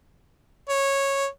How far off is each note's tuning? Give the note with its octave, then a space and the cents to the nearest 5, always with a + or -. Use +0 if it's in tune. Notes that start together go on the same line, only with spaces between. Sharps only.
C#5 -10